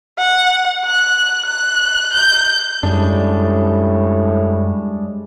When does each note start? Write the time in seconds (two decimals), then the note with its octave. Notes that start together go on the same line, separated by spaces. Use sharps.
0.18 F#5
0.85 F#6
1.45 F#6
2.13 G6
2.83 F#2 A2 G3 G#3 D4